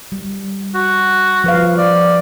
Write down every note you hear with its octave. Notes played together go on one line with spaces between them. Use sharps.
G3
F#4
F3 B4 F5
D5